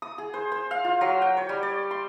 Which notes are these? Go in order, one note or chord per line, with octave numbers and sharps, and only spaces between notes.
D#6
G#4
C5
C5
F5
F4
F#3
G5
C#5
G3
D5
C6